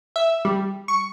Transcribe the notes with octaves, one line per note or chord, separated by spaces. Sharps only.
E5
G3
C#6